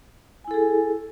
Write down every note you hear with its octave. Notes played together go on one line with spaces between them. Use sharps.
E4 G#4 A4 G#5